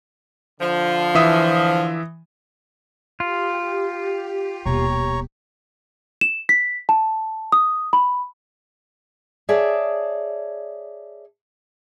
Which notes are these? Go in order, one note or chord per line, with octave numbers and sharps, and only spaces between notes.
D3 F3
E3 E5 D#6
F4 G4
D#1 B2 C#5 A#5 C#6
E7
B6
A5
D#6
B5
G#4 C#5 D5 E5 A5